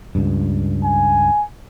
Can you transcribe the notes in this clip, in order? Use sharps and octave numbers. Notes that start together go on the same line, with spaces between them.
C#2 G2
G#5